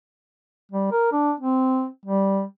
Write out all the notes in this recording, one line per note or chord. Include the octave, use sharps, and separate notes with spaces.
G3
A#4
D4
C4
G3